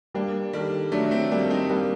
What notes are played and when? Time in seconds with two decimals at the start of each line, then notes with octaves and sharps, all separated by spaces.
0.14 G3 A#3 D4
0.53 D#3 G3 A4
0.92 F#3 A3 D4
1.11 A3 C4
1.32 G3 A#3 D4
1.50 C4 D#4
1.70 G3 A#3 D4